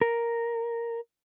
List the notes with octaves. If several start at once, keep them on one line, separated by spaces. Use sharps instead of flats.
A#4